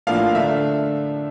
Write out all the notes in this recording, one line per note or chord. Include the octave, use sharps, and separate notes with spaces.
A2 F3 A#3 D4 F5
D3 A3 D4 E5